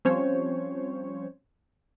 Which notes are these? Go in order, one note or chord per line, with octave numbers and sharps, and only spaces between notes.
F3 G3 C4 C#4 C5 C#5